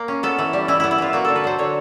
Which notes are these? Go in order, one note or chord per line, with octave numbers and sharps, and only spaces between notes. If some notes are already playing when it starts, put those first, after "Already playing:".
Already playing: A#3
C#4
B3 A4
E3
G3
E3 E4
B3 E4
E4
E3 F4
A#3 F#4
D3 A4
B4
F#3 C5
D3 C#5